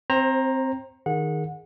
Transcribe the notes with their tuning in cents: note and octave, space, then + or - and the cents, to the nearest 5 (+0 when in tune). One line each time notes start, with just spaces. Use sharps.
C4 +0 C5 +30 A#5 +0
D#3 +0 G#4 +0 F#5 -25